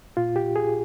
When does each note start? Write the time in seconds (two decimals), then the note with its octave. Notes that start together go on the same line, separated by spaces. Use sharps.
0.17 A#2 F4
0.36 G4
0.56 G#4